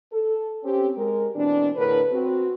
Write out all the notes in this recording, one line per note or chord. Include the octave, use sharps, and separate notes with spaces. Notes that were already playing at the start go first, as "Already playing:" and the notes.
A4
C4 C#4 G4
G#3 A#4
B2 E3 C4 D4
E2 A2 D3 A#4 B4
C4 F#4